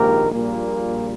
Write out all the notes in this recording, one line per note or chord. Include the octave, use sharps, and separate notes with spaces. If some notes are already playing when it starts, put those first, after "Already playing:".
Already playing: A#1 G#2 D#3 A#3 G4 A#4
A#1 A#2 G3 A#3